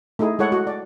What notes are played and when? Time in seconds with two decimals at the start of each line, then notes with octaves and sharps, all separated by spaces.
0.19 A3 D#4 E4 G#4
0.39 G#3 E4 A4 C#5 F#5
0.52 F#4
0.67 D5